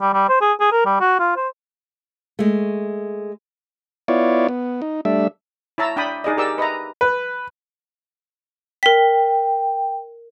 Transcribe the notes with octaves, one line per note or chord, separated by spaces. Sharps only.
G3
G3
C5
G#4
G#4
A#4
G3
F#4
F4
C5
G#3 A3
B3 E4 F4 C#5 D5
B3
D#4
G3 A3 D4 E5
E4 C#5 A5 A#5 E6
D4 G5 A5 B5 D#6
D#4 G#4 D5 D#5
G4 G#4 A#4 D5 D6 E6
B4 D#5 E5 A#5
B4
A#4 G5 B6